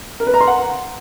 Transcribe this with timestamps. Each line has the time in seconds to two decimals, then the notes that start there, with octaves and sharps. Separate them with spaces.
0.20 A#4
0.27 B4
0.34 A#5
0.41 C6
0.47 F#5